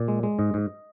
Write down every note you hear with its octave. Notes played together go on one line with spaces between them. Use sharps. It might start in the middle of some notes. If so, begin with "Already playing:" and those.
Already playing: A#2 D5
G#3
G#3
G#2 D#5
G#2